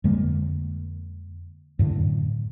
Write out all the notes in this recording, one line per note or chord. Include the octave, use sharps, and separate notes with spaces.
F2 D3 G#3 A#3
F#2 A2 D3